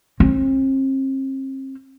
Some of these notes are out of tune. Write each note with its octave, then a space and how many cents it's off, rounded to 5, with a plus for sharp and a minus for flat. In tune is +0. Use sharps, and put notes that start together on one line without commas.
C4 +40